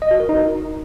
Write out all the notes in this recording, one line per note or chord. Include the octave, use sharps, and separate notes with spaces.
D#5
F#4
A#4
D#4